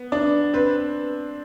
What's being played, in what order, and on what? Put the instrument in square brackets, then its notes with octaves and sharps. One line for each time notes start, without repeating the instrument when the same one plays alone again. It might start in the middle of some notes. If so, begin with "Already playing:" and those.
Already playing: [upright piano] B3
[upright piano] D4 [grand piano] D5
[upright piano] C4 [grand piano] B4